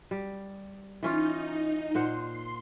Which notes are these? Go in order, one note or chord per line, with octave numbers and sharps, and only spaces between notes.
G3
E3 C#4 D#4 F4
A#2 C5 F#5 C6